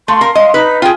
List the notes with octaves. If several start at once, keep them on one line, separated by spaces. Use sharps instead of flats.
A3 F5 C6
A#4
D#5
D#4 B4
F4 G#4 G5